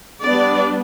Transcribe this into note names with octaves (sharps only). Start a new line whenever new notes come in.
G3 B3 D4 D5